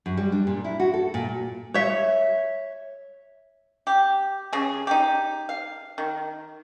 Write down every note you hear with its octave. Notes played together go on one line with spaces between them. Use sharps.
F#2
G3
D4
A#2
E4
F#4
A4
A#2
C#5 E5
G4
C#3 G#4
D#4 G4
F5
D#3